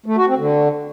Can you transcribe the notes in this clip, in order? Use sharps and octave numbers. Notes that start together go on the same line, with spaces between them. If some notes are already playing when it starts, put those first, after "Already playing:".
A3
F#4
C4
D3